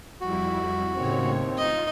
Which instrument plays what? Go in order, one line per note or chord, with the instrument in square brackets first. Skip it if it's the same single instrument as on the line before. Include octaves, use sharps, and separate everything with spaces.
[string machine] F2 G3 E4 [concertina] F#4
[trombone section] D#2 C4 [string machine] A2 C#3 C#5
[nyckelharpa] D#4 D#5 [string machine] F4